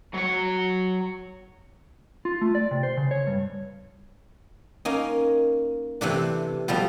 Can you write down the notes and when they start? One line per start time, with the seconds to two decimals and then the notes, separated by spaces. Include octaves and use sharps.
0.14 F#3 C#5
2.25 F4
2.41 A3
2.55 D5
2.71 C3
2.83 C5
2.97 C#3
3.11 C#5
3.27 G2
4.85 A#3 C#4 D#4
6.01 C3 E3 A3 D4
6.68 B2 F3 G3 A3